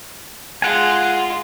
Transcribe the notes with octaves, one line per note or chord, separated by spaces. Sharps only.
G#3 F4 F#5 G#5